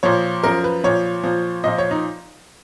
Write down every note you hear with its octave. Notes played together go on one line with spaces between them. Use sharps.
A#2 F3 C#5
F#2 F3 A#4
B4
A#2 F3 C#5
A#2 F3
A#2 F3 D#5
C#5
D#4